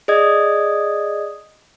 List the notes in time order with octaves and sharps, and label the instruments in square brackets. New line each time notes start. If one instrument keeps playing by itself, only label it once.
[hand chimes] G#4 D5 D#5 D#6 G#6